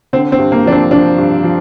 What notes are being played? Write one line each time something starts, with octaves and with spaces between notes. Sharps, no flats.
D3 C4
C4
G2
A#3
F3 D4
C4
F3 D4
G2
F3